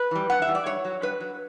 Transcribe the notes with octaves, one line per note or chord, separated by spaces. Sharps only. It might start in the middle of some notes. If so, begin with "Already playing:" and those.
Already playing: B4
E3 G3
G2 F#5
E5
E3 G3
D5
G2 C#5
F#3
G2 B4
F#3